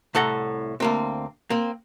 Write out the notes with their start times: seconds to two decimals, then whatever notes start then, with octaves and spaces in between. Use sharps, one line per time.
0.14 C2 A2 A4 F#5 A#5
0.80 D2 A#3 C4
1.50 A#3 C4